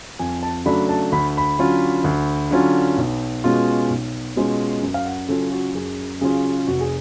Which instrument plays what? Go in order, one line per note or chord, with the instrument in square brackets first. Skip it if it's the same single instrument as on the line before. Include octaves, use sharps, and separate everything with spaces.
[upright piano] F2 G#5
A5
C#3 F#3 A3 D4 B5
A5
D2 B5
B5
D3 F#3 C#4 F4
D2
D3 F#3 C#4 F4
B1
B2 G#3 C#4 F4
B1
B2 G#3 C#4 F4
F#2
F5
F#5
C#3 F#3 C#4 F4 A4
F#4
F#2 G#4
C#3 F#3 C#4 F4 G#4
F1 F#4
G#4